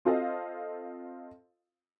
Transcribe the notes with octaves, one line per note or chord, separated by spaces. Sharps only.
C4 F4 A4 C5 D#5 F5